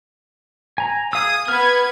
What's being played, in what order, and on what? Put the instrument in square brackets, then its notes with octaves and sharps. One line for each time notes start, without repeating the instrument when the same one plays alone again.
[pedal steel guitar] G#5 A#5
[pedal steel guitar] G#4 F5 E6 [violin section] D#6
[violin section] B3 B4 G#6 [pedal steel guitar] F6